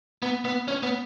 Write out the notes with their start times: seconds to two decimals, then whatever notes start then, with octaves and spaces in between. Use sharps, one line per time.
0.22 B3
0.45 B3
0.68 C#4
0.83 B3